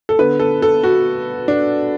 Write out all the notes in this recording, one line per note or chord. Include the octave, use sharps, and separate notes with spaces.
A4
D3 B3 B4
A4
A4
F#4
D4